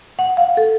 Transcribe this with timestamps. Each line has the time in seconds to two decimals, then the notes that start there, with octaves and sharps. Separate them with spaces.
0.19 F#5
0.37 F5
0.57 A4